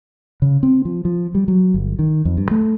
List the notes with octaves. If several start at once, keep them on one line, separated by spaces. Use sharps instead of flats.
C#3
C4
F3
F3
G3
F#3
G1
D#3
F2
G2
A3